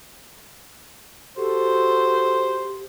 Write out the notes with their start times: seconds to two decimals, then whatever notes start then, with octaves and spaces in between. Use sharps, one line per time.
1.37 F#4 G4 A4 C5